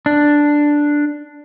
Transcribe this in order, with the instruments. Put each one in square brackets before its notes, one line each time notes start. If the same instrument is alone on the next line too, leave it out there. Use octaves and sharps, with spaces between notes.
[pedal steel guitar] D4